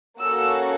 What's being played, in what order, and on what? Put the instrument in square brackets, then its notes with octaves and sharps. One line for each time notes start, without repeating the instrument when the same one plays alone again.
[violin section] A#3 C#4 F#4 A4 E6